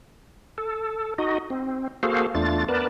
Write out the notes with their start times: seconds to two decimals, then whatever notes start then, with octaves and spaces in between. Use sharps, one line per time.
0.58 A4
1.18 D#4 F#4 D#5
1.50 C4
2.03 A#3 F#4 G#4 A4 C5 F5
2.35 E2 A3 D4 F4 A6
2.68 B3 A#4 B4 D5 A5